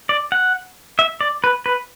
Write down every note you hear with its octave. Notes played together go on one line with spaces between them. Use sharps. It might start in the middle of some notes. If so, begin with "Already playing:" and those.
D5
F#5
E5
D5
B4
B4